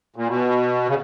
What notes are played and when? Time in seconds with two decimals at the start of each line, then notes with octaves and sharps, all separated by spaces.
0.16 A#2
0.28 B2
0.88 C#3